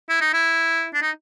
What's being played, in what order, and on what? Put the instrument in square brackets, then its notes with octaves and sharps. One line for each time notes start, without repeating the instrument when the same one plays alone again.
[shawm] E4
D#4
E4
D4
D#4